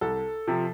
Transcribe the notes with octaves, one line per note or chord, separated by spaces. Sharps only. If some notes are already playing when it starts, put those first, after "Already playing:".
C2 A4
C3 F3